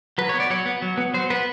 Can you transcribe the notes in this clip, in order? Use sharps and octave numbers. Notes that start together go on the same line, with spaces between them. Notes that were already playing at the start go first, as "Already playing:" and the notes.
F#3 B4
B3 C#5
D5
F#3 C#5
B3
F#3
B3
F#3 C5
B3 B4